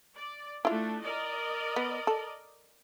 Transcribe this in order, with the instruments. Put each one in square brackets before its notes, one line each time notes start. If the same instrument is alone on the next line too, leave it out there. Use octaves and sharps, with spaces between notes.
[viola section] D5
[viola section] A3 D4 [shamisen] E4 F4
[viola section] A#4 D5 D#5
[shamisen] B3
A4